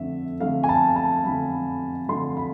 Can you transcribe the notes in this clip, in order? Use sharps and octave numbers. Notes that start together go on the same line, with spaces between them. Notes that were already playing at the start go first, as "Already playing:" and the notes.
Already playing: F2 D3 A3 E5
F2 D3 A3 F5
G#5
A5
A5
F2 D3 A3 B5
F2 D3 A3 C6
B5